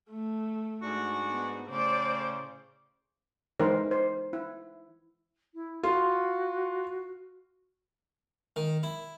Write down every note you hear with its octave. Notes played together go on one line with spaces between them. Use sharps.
A3
G#2 D4 F#4
B3 D#4
A2 C#3 C5 D5
E3 G#3 D#4 A#4 C5
C5
E4
E4
F4 F#4
D#3
E4